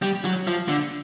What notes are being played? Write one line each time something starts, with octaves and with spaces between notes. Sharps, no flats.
G3
F#3
F3
D3